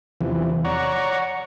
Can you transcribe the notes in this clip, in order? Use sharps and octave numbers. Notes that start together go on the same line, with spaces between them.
E2 C3 E3 F3
C#5 D5 F#5 A#5 C#6